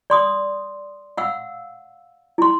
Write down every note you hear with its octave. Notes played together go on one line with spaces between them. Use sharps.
D5 C6 D#6
F5 F#5 E6
E4 C6